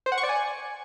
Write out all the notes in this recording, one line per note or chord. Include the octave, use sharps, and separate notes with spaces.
C5
F#5
C#6
D5
G#5